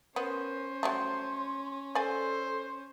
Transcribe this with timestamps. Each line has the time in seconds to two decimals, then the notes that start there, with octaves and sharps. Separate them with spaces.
0.16 B3 C#4 A#4 C5
0.83 F#3 G3 A3 C6
1.95 A4 C5 D5 G#5